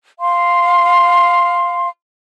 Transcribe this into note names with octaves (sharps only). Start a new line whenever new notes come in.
F5 C6